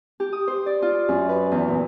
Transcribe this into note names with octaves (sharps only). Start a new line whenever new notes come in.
G4
D#6
C5
D5
F4
F#2
B4
E2
A#2